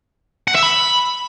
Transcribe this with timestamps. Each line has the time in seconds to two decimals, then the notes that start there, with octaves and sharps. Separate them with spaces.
0.48 F#5
0.55 E5
0.63 B5